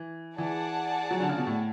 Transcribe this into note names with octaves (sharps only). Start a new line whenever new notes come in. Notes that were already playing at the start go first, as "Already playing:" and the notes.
Already playing: E3
E3 G#4 D5 F#5 A5
F#3
D3
C#3
B2
A2